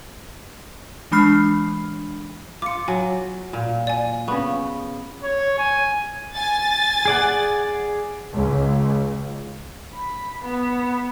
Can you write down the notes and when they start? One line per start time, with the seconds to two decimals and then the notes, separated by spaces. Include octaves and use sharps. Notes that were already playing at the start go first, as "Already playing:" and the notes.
1.12 E3 G#3 D4 B5 F6 C7
2.62 F4 D6 C#7
2.88 F#3 G#5
3.53 A#2
3.87 D5 G#5
4.28 C#3 B3 C#6
5.23 C#5
5.59 G#5
6.35 G#5 A6
7.05 G#4 D5 F#5
8.32 C#2
9.93 B5
10.42 B3